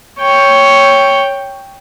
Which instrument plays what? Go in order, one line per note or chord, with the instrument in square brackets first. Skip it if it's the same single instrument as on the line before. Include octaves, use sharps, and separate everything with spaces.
[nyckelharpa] C#5 G5